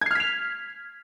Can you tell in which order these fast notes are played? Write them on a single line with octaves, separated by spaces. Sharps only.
G#6 C7 F6 B6 F7